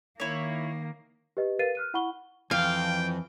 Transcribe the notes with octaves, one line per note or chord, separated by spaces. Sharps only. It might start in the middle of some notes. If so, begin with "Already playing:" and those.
D#3 A#3 E4 C#5
G4 B4 D#5
A#4 B4 F5 A6 C7 D#7
F6 F#6 D#7
E4 F#5 B5 C#6 G7
F2 E3 F5 G5